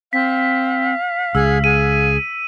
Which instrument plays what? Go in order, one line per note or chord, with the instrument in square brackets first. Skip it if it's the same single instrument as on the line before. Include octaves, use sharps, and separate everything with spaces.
[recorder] C4 [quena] F5 [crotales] B6
[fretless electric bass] C#2 [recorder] G#4 [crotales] E6
[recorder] G#4 [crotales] D#7